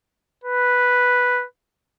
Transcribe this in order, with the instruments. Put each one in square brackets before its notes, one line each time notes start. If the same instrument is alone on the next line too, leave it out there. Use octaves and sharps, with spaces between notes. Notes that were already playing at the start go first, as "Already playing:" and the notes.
[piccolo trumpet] B4